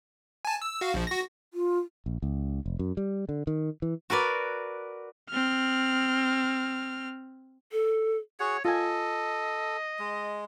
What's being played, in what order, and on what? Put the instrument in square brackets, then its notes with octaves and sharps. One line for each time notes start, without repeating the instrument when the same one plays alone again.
[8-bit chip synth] G#5 A5
E6
F#4 F5
A#1 F3
F#4 A#6
[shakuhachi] F4
[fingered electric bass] A#1
C#2
F1
F#2
G3
D3
D#3
E3
[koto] F#4 A#4 B4 D5
[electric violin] C4 F6
[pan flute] A4
[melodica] F#4 G#4 F#5 [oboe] C#5
[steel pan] F4 G#5 [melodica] A4 [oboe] D#5
[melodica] G#3